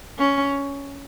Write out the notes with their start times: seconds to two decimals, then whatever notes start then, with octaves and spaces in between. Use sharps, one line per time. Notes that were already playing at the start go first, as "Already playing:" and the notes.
0.18 C#4